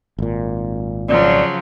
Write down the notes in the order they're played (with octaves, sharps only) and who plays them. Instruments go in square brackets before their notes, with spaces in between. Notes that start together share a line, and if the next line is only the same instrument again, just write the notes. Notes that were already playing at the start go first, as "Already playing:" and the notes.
[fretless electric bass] G#1 A#2
[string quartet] C#3 F3 F#3 [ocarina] D5